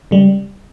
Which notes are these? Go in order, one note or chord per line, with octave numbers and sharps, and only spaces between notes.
C#3 G3